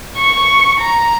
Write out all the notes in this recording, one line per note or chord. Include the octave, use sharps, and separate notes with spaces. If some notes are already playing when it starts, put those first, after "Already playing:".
C#6
A#5